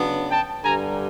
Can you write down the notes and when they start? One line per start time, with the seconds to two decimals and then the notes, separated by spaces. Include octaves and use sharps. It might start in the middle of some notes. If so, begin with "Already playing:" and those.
Already playing: C#3 F#3 B3 D4
0.31 G5 A5
0.63 G2 D3 G3 G#5 A#5